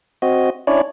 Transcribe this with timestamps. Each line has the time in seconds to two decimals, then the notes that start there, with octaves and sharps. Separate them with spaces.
0.22 C4 F#4 D#5
0.67 C#4 D4 E4 C#5 D5